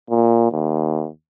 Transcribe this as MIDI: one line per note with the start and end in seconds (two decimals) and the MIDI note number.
0.10 0.47 46
0.52 1.08 39